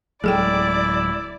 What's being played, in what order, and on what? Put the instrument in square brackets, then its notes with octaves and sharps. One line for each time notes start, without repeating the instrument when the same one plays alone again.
[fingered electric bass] D1 F#3 G#3 [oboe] E4 [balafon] G#4 A4 G5 [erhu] D5